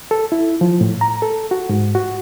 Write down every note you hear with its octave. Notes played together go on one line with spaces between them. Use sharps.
A4
E4
F3
A2
A#5
A4
F#4
G#2
F#4